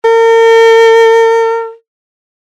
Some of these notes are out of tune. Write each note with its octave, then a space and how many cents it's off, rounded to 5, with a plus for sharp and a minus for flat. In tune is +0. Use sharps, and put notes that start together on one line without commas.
A#4 -40